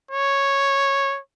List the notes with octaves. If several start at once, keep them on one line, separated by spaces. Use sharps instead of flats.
C#5